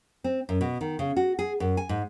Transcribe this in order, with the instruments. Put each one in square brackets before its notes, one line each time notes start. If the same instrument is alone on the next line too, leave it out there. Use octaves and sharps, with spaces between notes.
[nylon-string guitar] C4
F#2
B2
D#3
C#3
F#4
G#4
F#2
G#5
G#2